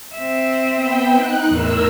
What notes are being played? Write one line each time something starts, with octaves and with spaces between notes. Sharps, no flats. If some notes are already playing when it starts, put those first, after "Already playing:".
C4 E5
B3 G5
D#4 F#6
E2 A2 A#4 E6